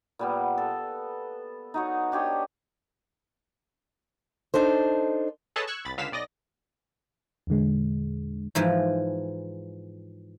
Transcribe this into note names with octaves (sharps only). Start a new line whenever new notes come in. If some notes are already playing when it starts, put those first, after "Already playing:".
A#2 G3 B3
A4
D#4 F#4 C#5
D4 G4 C#5 D#5
D4 D#4 A4 C5
G#4 A4 B4 C#5 D#5 A5
C#6 E6 F#6 G#6
C2 B5 A6
C#2 D3 F5 B6 E7
B1 D5 D#5 A#6
E2 A#2 D3 G#3
G#2 E3 F3